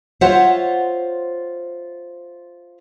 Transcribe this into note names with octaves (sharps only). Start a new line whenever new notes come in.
F4 C5 C#5 E5 F#5